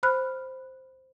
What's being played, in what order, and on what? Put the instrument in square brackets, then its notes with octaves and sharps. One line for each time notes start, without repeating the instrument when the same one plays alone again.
[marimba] C5 B5 F6 F#6